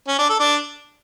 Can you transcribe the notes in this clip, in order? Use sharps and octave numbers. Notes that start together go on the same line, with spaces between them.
C#4
D4
A4
D4